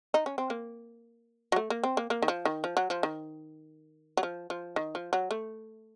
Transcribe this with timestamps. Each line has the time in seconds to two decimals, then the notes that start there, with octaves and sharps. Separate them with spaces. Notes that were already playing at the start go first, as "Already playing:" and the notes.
0.14 D#4
0.26 C#4
0.38 C4
0.50 A#3
1.52 F#3
1.56 A3
1.70 A#3
1.84 C4
1.97 A#3
2.10 A#3
2.22 D#3
2.28 F3
2.45 D#3
2.64 F3
2.77 F#3
2.90 F3
3.03 D#3
4.17 F#3
4.23 F3
4.50 F3
4.76 D#3
4.95 F3
5.13 F#3
5.31 A3